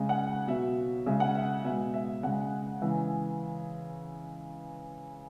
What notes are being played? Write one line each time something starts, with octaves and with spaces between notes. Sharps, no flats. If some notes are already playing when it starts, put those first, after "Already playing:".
Already playing: C#3 G#3
F#5
B2 F#3 E5
C#3 G#3 E5
F#5
E5
B2 E5
G#3
E5
C#3 G#3 F#5
C#3 E3 G#3